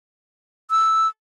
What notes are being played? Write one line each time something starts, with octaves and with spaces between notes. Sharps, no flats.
E6